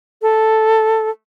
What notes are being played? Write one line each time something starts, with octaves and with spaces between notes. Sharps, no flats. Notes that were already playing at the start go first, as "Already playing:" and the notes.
A4